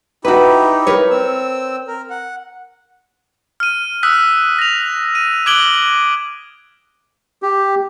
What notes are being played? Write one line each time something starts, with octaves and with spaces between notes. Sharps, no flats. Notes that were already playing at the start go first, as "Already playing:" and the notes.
D#4 E4 F#4 G4 B4
A#4 B4 C#5
C4 E6
A#4
F#5
F6 D#7
D#6 E6 F#6 B6
A#6 F7
D#7
D6 F#6 G#6 D7 F#7 G7
G4